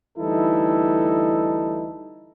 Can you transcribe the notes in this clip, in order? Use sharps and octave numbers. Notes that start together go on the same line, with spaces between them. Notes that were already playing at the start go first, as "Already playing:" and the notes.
D2 E3 G3 D#4 E4 A4